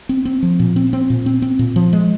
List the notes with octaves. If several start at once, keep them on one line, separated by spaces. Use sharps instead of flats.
C4
C4
F3
A#2
C4
C4
A#2
C4
C4
A#2
F3
G#3